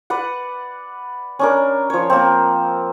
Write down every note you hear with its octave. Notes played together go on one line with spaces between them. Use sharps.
B4 D5 F#5
C#4 D4 A#4
F3 C#5
A#3 C4